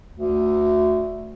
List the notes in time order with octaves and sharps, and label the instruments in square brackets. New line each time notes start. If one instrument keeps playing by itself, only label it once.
[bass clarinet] D2